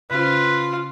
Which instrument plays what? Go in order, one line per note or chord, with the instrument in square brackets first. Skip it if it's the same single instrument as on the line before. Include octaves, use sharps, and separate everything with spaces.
[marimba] C#3 C#4 C5 [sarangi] F4 [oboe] B4